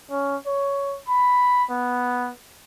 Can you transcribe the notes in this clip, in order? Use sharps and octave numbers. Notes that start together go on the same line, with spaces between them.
C#4
C#5
B5
B3